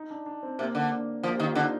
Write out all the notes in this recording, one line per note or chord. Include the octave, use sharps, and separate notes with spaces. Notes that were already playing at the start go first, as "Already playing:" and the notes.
Already playing: D#4
D4
D4
C4
C3 A#3
D3 A#3
F3 A#3
G4
D#3
F4
D3 D#4